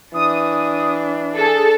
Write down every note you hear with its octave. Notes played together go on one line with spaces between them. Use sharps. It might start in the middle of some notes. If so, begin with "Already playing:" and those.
E3 D4 D#6
G#4 A4